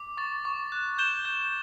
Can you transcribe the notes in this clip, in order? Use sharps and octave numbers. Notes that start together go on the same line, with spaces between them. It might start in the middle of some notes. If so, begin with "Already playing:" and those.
Already playing: D6
C#6 A6
C#6
F#6
G6 E7 G7
G6